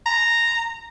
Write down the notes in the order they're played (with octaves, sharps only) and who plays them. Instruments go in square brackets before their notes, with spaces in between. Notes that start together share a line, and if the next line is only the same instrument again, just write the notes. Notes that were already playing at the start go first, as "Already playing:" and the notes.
[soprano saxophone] A#5